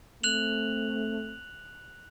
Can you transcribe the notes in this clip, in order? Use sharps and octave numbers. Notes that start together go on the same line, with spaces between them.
A3 C4 F#6 F7 F#7